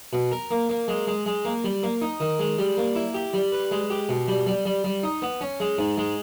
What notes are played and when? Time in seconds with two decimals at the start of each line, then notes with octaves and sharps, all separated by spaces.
0.13 B2
0.32 A#4
0.51 A#3
0.69 A#3
0.88 G#3
1.07 G#3
1.26 G#3
1.45 A#3
1.64 G3
1.83 A#3
2.01 D#4
2.20 D#3
2.39 G#3
2.58 G3
2.77 A#3
2.96 E4
3.14 G4
3.34 G3
3.52 B4
3.71 G#3
3.90 G4
4.09 B2
4.28 G3
4.46 G3
4.65 G3
4.84 G3
5.03 D#4
5.22 B3
5.41 C#4
5.60 G#3
5.79 G#2
5.98 G#3